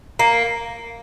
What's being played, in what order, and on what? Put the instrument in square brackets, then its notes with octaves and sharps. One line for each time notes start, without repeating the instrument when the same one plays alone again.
[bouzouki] A#3